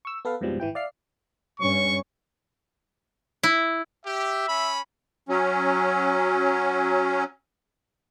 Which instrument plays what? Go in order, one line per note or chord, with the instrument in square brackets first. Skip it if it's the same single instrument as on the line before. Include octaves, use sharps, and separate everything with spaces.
[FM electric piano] C#6 E6
B3 A4 B4 F5
F2 G#2 B2 F3 G3
G#1 E3 E4 G5
D5 E5 F5 F6 C7
[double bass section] G2 C#4 [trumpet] C#6
[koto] E4
[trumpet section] G4 [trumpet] E5
[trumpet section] C#4 B5
[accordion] F#3 C#4